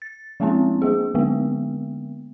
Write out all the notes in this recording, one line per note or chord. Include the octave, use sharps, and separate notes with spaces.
A6
F3 G#3 A#3 C4 C#4 E4
G3 A#3 G#4
D3 G#3 A#3 B3